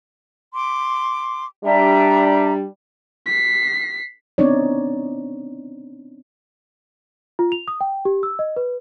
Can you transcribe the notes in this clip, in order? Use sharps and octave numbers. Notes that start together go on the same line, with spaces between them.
C6 D6
G3 D4 E5 A5 A#5
B6 C7
B3 C4 D4 D#4 C#5 D5
F4
F7
D#6
G5
G4
E6
D#5
B4